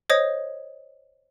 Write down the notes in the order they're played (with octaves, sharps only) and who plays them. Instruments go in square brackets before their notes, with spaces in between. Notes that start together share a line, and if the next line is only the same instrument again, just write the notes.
[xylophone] C5 C#5 D#5 D#6 G#6